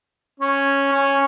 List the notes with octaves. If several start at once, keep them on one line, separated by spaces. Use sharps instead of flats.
C#4
C#4